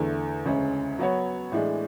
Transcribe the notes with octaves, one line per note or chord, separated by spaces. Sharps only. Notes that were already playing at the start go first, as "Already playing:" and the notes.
Already playing: E2 D3 A3
D2 C#3 G#3 C#4
F#3 B3 F#4 C#5
A2 E3 G#3 D4